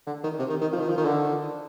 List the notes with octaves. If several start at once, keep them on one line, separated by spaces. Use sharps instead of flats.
D3
D#3
C3
D#3
D#3
F3
D#3
F3
D#3
D3